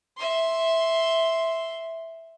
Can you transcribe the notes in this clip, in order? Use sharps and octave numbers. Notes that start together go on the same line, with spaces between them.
E5 C6